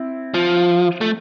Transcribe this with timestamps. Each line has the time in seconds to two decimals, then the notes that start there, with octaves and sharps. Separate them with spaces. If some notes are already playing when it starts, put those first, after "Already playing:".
Already playing: C4 E4
0.34 F3
1.01 A3